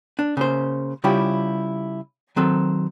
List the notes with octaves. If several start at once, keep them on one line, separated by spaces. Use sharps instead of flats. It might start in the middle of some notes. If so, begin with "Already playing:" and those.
D4
C#3 A#3 C5
C#3 G3 E4 F4 G4
D#3 F#3 C4 A4